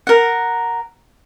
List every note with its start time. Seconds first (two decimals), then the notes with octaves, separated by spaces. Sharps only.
0.07 A#4 F#5